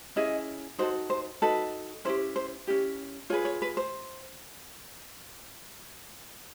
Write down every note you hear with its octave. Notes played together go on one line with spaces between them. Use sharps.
C#4 E4 G#4 D#5
D#4 F#4 A4 C5
C5
D#4 F#4 A4 B4
C#4 E4 G4 C5
C5
C#4 E4 G4
F4 G#4 B4 C#5
C#5
B4
C5